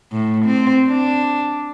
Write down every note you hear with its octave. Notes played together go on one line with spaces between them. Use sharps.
A2
C4
D4